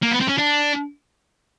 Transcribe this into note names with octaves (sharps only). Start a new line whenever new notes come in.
A#3
B3
C4
C#4
D4